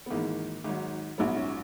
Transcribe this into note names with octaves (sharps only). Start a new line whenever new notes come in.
B3
G#1 G#2 E3 G#3 A#3
G#1 G#2 F#3
A#1 G#2 F#3 B3
C#4